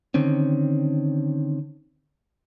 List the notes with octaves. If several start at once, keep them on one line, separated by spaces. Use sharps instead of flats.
D3 D#3 C4 C#4